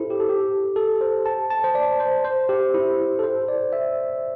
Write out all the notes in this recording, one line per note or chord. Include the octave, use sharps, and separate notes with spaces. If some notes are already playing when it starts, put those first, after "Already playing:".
Already playing: E4 G4 A4 C5
G4
A4
G4
A4
C5
A5
A5
C5
D5
C5
C5
G4
E4
A4
C5
D5
E5